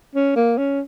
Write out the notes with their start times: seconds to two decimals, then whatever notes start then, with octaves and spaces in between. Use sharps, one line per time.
0.15 C#4
0.36 A#3
0.58 C#4